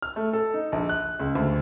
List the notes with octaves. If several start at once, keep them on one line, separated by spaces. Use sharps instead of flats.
F6
A3
A4
D#4
A#1
F#6
C#2
D2